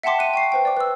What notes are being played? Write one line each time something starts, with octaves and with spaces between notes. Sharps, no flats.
E5 F#5 G5 A5 C6 D6
F#6 C#7 D#7
G5 C#6 C7
B4 C5 G5
D5 D6
B4 C6 E6